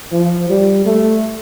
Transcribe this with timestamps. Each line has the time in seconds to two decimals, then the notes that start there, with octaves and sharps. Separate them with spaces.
0.12 F3
0.49 G3
0.85 A3